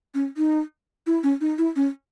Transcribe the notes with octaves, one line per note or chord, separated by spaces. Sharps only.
C#4
D#4
E4
C#4
D#4
E4
C#4